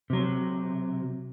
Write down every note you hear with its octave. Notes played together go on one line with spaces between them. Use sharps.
C3 F#3